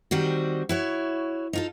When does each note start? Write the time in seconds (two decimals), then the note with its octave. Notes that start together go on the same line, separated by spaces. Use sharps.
0.11 D#3 G3 C4 F#4
0.69 E4 F#4 C#5
1.53 D#4 F4 A4